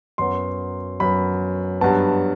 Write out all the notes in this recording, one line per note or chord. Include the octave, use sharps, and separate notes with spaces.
F#2 F#3 B3 C6
F#2 F#3 B3 B5
G2 F#3 B3 A5